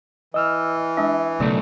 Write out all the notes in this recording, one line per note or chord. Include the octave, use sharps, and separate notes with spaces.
E3 D#5 E6 F6
G#3 D4 E5
B1 C#3 A3 A4 D5